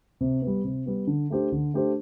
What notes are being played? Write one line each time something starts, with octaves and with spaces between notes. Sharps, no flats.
C3
B3
G3
C3
G3 B3
D3
A3 D4 G4 C5
D3
A3 D4 G4 C5